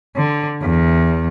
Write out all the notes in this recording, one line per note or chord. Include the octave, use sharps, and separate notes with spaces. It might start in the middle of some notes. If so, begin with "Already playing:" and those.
D3
E2